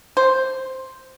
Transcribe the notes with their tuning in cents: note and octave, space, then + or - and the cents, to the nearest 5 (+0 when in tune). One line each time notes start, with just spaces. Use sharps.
C5 +0